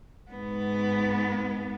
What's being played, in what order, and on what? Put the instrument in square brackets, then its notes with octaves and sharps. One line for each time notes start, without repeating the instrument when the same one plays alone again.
[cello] G#2 B3